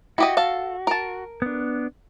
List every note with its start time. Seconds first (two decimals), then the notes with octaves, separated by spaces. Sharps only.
0.18 E4 F#4 G4 D#5
0.37 A4 F5
0.87 A#4 A5
1.42 B3 D4